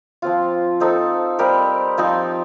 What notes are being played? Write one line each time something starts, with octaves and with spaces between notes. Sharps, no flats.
F3 C4 F4
C4 D#4 A4
G3 C4 G4 A#4
F3 C4 D#4